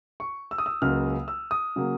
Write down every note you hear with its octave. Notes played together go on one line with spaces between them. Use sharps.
C#6
E6
D#6
E6
C#2 C#3 F#3 A#3 F6
E6
D#6
C#3 F#3 A#3